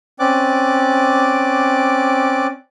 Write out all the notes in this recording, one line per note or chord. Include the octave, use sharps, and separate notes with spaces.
C4 C#4 D5 D6 F#6